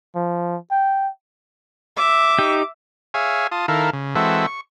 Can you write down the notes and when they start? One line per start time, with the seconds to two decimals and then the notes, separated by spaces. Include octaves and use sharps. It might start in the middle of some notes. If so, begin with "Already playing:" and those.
0.16 F3
0.71 G5
1.97 E5 D6
2.38 D#4 G4 G5
3.14 G#4 C#5 E5 F5 G#5
3.52 F4 A5 D#6
3.68 D#3 E4 A4 A#4 F5
3.93 C#3
4.15 E3 G#3 C4 F#4 A4 E5
4.47 C#6